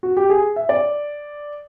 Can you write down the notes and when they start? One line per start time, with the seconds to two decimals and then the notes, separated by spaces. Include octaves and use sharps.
0.03 F#4
0.17 G4
0.30 G#4
0.56 E5
0.69 D5